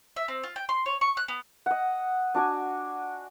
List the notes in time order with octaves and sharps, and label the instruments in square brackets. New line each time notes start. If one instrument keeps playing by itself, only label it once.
[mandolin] E5
C4
F4
G5
C6
C#5
C#6
F#6
B3
[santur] D#5 F#5
D4 F#4 D5 G#5